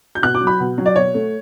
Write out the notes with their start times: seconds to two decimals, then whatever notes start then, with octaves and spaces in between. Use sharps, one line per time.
0.15 G6
0.22 B2 F#6
0.35 D6
0.41 F#3
0.47 B5
0.60 B2
0.78 F#3
0.86 D5
0.96 B2 C#5
1.14 A3